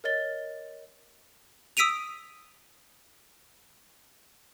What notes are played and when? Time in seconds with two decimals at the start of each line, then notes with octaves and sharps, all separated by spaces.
0.04 A#4 C#5 D#5 A6 G7
1.77 D#6 E6 B6 D7 D#7 F7